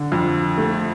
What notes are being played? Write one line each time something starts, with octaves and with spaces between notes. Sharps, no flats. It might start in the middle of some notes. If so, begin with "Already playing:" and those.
Already playing: D3
F2
A3